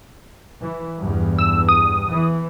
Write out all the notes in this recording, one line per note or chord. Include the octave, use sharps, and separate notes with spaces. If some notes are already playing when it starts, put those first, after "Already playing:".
E3
E2 G2
E6
D#6
E3